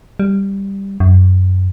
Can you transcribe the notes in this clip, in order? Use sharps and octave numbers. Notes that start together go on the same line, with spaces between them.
G3
F#2